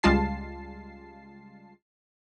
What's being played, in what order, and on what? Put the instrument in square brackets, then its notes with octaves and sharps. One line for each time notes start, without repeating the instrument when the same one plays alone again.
[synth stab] C#2 G3 G#3 F4 A5 C7